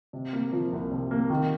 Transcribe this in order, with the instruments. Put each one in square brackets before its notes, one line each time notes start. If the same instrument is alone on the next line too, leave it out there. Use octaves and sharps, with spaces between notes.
[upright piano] C3
A#3
F3
C2
C3
A#3
D#3